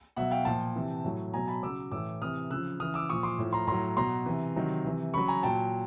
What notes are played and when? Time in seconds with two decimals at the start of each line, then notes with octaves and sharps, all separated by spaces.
0.16 B2 F#3 E5 F#5
0.31 F5 G5
0.45 A#2 F3 G5 A5
0.76 C3 E3
1.04 A2 F#3
1.33 B2 F#3 G#5 A#5
1.48 A5 B5
1.63 C#3 F#3 D6 E6
1.92 A2 E3 D6 E6
2.22 C3 E3 D#6 F6
2.50 C#3 F3 E6 F#6
2.80 C#3 E3 D#6 F6
2.94 D6 E6
3.09 A#2 F3 C#6 D#6
3.23 C6 D6
3.38 A2 F3
3.53 A#5 C6
3.67 A2 F#3 A#5 C6
3.97 B2 F#3 A#5 C6
4.26 C3 E3
4.56 C3 D#3 F#3
4.85 C3 E3
5.14 C#3 F#3 B5 C#6
5.28 G#5 A#5
5.43 A#2 F#3 G5 A5